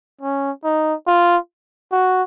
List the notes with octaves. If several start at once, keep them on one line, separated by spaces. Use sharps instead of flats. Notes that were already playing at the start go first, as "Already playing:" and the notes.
C#4
D#4
F4
F#4